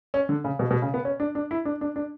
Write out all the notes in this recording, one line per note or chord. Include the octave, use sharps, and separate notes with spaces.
C#4
D3
C#3
B2
B2
C#3
B3
C#4
D4
D4
E4
D4
D4
D4